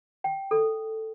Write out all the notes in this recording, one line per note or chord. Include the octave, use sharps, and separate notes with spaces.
G5
A4